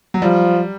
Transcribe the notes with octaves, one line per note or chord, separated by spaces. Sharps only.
F#3
F3 G3